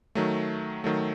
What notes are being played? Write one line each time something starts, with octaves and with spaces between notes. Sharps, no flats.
D#3 F#3 A3
D#3 F#3 A3